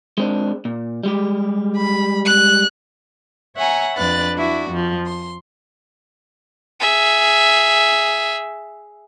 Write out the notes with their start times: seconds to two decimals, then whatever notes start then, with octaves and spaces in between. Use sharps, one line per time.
0.18 G#3 C4 D4
0.65 A#2
1.04 G3 G#3 G4
1.76 B5
2.26 F#6
3.55 C#5 E5 F#5 G#5 A#5
3.96 F2 D4 B4 F#6 A6
4.35 D4 E4 F#4
4.70 F2 F3
5.06 C6
6.80 G#4 E5